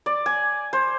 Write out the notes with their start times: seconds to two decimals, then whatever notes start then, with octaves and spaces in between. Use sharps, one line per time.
0.06 D5
0.26 G#5
0.73 C5